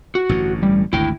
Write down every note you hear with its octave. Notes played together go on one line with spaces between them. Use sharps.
F#4
A1 G2 D3
G3
G#1 D2 E4 G5